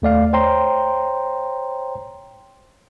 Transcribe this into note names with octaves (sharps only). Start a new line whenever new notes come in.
D#2 A3 D5 F5
C5 C#5 G5 A#5 C6